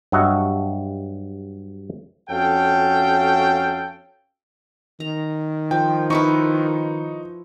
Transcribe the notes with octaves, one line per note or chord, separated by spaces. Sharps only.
G2 F#3 F#4 D#5 E5 F#5
F2 C#4 F#4 A4 F5 G5
D#3 A#5
F3 G5
F3 D#4 E4 B4 C#6